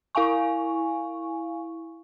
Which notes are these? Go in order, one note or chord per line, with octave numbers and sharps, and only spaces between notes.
E4 F5 G#5 C#6